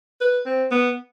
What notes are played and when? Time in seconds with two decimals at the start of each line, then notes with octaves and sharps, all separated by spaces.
0.21 B4
0.46 C4
0.71 B3